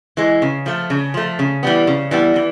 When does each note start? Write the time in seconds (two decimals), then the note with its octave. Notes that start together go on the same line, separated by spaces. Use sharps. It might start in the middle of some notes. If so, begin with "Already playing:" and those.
0.17 E3 G#3
0.42 C#3
0.66 F3 A3
0.90 C#3
1.14 F3 A3
1.39 C#3
1.63 E3 G3 B3
1.87 C#3
2.11 E3 G3 B3
2.36 E3